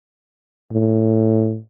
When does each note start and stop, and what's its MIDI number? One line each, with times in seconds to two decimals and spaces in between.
0.71 1.58 45